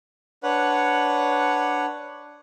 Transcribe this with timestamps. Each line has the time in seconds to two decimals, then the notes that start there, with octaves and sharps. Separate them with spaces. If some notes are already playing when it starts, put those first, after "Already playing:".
0.43 D4 B4 C#5 F#5